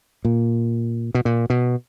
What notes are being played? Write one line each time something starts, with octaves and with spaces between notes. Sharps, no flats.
A#2
B2
A#2
B2